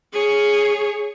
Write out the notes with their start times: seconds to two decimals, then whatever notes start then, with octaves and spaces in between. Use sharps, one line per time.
0.13 G#4 C#5